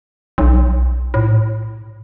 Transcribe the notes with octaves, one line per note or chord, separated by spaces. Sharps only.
B1
A2